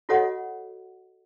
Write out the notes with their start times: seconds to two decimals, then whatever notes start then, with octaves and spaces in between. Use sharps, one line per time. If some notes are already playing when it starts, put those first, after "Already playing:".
0.09 F4 F#4 A4 C#5 D#5 F#5